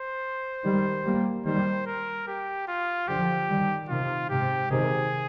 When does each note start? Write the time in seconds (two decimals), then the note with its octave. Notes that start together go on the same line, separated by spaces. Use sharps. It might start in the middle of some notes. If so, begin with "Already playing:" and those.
Already playing: C5
0.64 D#3 G3
1.05 G3 A#3
1.45 D#3 G3 C5
1.86 A#4
2.28 G4
2.68 F4
3.08 D3 F3 G4
3.49 D#3 G3
3.89 C3 D#3 F4
4.30 G#2 C3 G4
4.71 C3 D#3 G#4